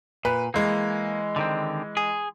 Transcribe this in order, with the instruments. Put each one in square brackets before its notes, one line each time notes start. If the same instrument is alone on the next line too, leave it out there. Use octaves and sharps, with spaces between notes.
[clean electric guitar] A#2 [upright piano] B4
[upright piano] E3 G#3 [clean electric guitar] A#3
[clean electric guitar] D3 D#3 C4
G#4